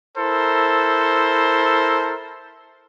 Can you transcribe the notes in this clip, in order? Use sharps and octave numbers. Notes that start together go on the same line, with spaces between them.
E4 A4 A#4 C5